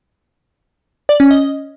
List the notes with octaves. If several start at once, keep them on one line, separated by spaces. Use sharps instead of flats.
D5
C#4
D#5